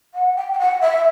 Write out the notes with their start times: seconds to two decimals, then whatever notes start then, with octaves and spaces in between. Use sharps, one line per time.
0.14 F#5
0.36 G5
0.52 G5
0.59 F#5
0.81 E5